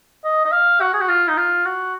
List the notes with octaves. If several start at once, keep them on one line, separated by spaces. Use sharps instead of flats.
D#5
D#5
F5
F#4
G#4
F#4
F4
D#4
F4
F#4